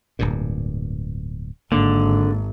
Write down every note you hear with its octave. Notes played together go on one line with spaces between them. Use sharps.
D1 G2 A#2
G#1 D3 A#3